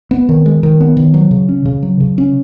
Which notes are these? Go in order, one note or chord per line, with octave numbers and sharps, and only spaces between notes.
B3
D#3
G#3
D#3
B3
D#3
F#3
C#3
C#4
C#3
F#3
C#3
C#4